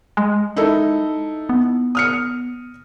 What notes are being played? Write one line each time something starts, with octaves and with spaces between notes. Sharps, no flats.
G#3
D#4 E4 A4
B3
D#6 F6 C#7